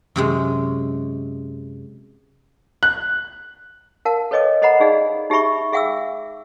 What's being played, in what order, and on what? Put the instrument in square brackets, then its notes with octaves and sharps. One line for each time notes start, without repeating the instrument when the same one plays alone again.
[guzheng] F#2 C3 G#3
[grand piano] F#6
[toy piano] A#4 F5 A5
A4 B4 C#5 D#5 G5 D6
A4 C5 D#5 F#5 A#5 B5
D#4 G#4 D5 F5
D#4 G4 G#4 E5 B5 C#6
G#4 E5 F5 G5 D6 E6